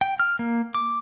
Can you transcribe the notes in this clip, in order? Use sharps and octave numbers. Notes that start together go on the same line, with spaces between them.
G5
F6
A#3
D6